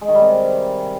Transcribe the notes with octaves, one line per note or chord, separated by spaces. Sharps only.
G#3
D#3
G3
C3